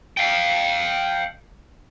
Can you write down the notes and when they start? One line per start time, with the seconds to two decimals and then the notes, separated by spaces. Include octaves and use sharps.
0.17 F5 G5